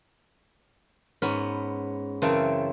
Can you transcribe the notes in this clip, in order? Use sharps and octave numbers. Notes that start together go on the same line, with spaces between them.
G#2 B3 C#4 B5
F#2 C#3 E3 C4 A5